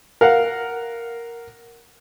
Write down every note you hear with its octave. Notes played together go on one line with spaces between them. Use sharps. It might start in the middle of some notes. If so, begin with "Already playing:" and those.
A#4 F5 F#5